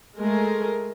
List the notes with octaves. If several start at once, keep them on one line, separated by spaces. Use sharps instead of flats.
G#3 A3 A#4